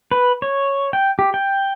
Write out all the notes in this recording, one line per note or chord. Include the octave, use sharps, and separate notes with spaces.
B4
C#5
G5
G4
G5